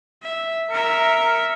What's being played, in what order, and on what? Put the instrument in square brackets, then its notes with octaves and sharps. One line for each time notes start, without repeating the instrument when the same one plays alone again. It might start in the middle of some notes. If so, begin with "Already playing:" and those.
[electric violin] E5
[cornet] A#4 [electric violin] E5 C#7